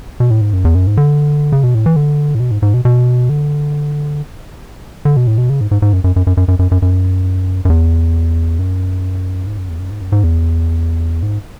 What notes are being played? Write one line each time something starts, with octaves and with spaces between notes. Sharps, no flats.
B2
A2
G#2
F#2
E2
F#2
G#2
D3
C#3
B2
A2
E3
D3
A2
B2
G#2
G#2
B2
B2
D3
D3
B2
A2
B2
C#3
G#2
G#2
G#2
F#2
F#2
F#2
F#2
F#2
F#2
F#2
F#2
F#2
F#2
E2
F#2
G#2
F#2
E2
F#2
G#2
F#2
G#2
E2
G#2